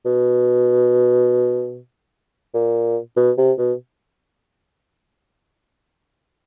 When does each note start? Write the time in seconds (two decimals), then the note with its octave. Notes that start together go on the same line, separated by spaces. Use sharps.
0.05 B2
2.54 A#2
3.17 B2
3.38 C3
3.58 B2